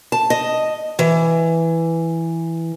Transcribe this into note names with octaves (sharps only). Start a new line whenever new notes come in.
A5
D#5
E3